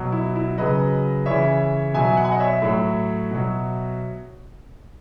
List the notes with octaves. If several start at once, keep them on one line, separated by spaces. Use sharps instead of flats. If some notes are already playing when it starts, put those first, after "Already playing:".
Already playing: B2 F#3
E4
E4
C#3 F#3 B4 D#5
C#3 E3 C#5 E5
B2 F#3 E5 G#5
F#5
G#5
D#5 F#5
C#5 E5
A2 F#3
B2 F#3